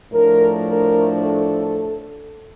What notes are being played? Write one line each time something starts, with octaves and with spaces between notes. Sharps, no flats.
A2 F3 A3 D4 A#4
A#4
A4